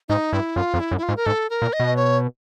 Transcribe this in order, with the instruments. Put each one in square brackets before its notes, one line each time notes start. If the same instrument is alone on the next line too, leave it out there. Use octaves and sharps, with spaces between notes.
[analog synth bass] G#2 [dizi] D#4
[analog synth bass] G2 [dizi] E4
[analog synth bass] F#2 [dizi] F4
[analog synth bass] F2
[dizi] E4
[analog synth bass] F#2
[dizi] E4
F4
[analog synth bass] G#2
[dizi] A#4
[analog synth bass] G#2 [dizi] A4
[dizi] A#4
[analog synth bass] A#2
[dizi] D#5
[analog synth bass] B2
[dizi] C#5